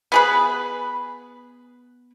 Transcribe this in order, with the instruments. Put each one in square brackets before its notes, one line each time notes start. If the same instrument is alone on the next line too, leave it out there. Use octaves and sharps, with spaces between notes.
[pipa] B3 G#4 B4